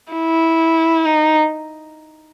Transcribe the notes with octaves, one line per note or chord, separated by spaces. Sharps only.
E4
D#4